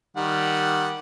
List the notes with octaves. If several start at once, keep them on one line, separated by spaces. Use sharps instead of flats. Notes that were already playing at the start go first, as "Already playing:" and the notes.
D#3 G3 F#5